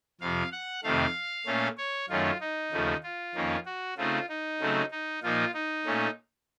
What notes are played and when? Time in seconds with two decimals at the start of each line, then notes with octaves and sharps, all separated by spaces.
0.21 F2 C3 F3 F5
0.52 F#5
0.84 F2 C3 D#3 A3 F5
1.46 A#2 A3 C#4
1.78 C#5
2.09 F#2 D#3 A3 C#4 F4
2.40 D#4
2.72 D#2 C#3 F3 A3
3.03 F4
3.35 F2 D#3 A#3 C#4
3.66 F#4
3.97 C#3 A3 C4 D#4 F4
4.29 D#4
4.60 C#3 F#3 A3 C4
4.91 D#4
5.23 A#2 F3 A#3 D#4 F4
5.54 D#4
5.85 A#2 A3 C#4